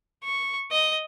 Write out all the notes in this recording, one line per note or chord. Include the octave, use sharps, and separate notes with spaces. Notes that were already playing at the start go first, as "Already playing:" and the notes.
C#6
D#5